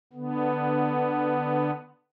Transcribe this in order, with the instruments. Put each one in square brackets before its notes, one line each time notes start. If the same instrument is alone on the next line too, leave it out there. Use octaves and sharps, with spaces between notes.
[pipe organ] D3 B3